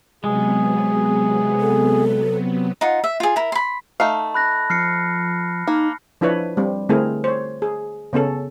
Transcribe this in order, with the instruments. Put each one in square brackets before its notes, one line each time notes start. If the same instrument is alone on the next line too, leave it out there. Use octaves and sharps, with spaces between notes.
[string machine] C3 F#3 B3 [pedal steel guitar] G#3 [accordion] G#4
[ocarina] A4
[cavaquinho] D#4 F4 F#5
E5
F4 G#4
E4 A#4
B5 C6
[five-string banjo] A3 D#4 F5 [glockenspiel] A5
[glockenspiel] B5 F#6 A#6
[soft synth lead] F3 [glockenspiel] F6 C7 C#7
[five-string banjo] A#3 [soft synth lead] D#4
[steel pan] F3 D4 E4 B4 C#5
G3 C4
D3 A3 C4 E4 G#4 A#4
C5 C#5
G#4
C#3 B3 C#4 A4